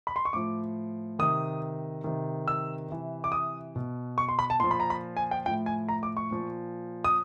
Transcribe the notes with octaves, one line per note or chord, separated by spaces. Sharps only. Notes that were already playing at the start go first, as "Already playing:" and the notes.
B5
C6
C#6
A2 F3 D6
C3 D#3 D#6
C3 D#3
E6
C3 E3
D6
D#6
B2
C#6
C6
B5
A5
A#2 F3 C6
B5
A#5
B5
G#5
G5
A2 F3 G5
G#5
A#5
D6
C#6
A#2 F3
D#6